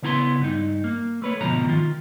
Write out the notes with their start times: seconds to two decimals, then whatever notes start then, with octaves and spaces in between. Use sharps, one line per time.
0.02 C#3 B3 E4 A#5 C6
0.42 G2 D#4
0.84 A#3
1.22 A3 B4 C#5
1.41 D2 G#2 B2 F3 A#5
1.65 D#3 F4